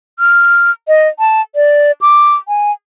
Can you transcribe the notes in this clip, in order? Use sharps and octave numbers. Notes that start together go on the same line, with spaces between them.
F6
D#5
A5
D5
D6
G#5